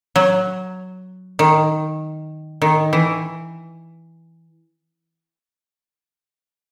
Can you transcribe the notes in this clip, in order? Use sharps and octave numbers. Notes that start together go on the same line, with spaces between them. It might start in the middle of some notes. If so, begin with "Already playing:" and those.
F#3
D#3
D#3
E3